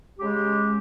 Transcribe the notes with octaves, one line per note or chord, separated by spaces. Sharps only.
C#3 G#3 G4